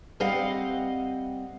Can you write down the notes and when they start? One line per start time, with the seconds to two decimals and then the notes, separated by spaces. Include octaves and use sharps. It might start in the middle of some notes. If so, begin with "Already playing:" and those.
0.20 G3 C4 D#5 F5 F#5